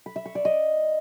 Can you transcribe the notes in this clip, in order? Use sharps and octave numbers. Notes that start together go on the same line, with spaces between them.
B5
E5
C#6
D5
D#5